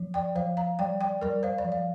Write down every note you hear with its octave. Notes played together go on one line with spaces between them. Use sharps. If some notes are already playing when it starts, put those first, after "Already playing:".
Already playing: F3
D5 G5
F3 C5 F5
F5 A#5
G3 D5 G5
D5 G5
G3 A#4 D5
C5 F5
D5
F3
F5